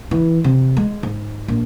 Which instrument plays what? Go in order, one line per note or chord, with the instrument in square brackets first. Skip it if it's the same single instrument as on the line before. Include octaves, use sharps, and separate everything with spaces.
[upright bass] E3
C3
G#3
G#2
A#1